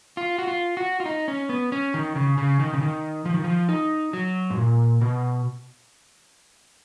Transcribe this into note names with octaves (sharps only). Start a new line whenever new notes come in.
F4
F#4
F4
F#4
F4
D#4
C#4
B3
C#4
D#3
C#3
C#3
D#3
C#3
D#3
F3
D#3
F3
D#4
F#3
G#2
A#2
B2